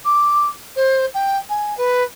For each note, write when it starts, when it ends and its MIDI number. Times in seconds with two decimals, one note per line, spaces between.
0.05 0.50 86
0.76 1.06 72
1.14 1.37 79
1.49 1.76 80
1.77 2.03 71